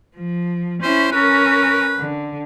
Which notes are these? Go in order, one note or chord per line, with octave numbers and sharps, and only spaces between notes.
F3
C#4 E4 C5
C#4 A#4 B4
D3